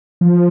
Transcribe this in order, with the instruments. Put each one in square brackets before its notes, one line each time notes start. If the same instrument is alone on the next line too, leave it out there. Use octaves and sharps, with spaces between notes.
[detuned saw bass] F3